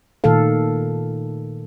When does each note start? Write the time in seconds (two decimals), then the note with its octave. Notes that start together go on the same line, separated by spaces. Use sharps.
0.24 A#2 D#3 A3 A4 F5